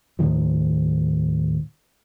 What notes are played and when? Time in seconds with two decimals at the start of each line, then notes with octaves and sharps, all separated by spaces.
0.19 D#2 A2 D#3 F3